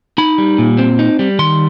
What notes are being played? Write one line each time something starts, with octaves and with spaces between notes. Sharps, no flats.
D#4 B5
G3
A#2
C4
D#4
G3
D#3 C6